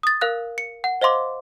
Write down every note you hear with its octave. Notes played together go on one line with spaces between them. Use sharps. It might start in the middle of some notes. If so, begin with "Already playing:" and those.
D#6 A6
A#4 F5 F#6
C#7
F#5
C5 D#5 F5 C6 D6